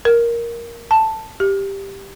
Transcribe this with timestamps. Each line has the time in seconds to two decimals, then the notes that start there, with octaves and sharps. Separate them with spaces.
0.05 A#4
0.91 A5
1.40 G4